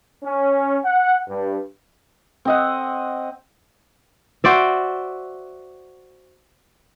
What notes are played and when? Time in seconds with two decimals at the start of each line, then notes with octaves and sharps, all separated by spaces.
0.23 C#4
0.85 F#5
1.29 G2
2.45 C4 D#5 F#5
4.44 F#4 C5 D5 E5